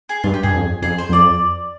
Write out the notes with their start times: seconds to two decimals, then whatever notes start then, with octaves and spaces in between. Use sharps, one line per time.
0.09 G#4
0.23 G2 F4
0.34 G4
0.43 G2 G#4
0.53 F2
0.82 F2 G#4
0.98 C5
1.09 F2 D5